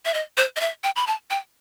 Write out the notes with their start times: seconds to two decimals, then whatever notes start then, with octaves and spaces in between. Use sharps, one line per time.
0.05 E5
0.14 D#5
0.37 C5
0.56 D#5
0.60 E5
0.84 G5
0.96 B5
1.07 A5
1.31 G5